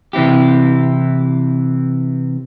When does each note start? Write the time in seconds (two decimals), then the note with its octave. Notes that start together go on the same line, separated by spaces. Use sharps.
0.13 C3 E3 C4 E4 G4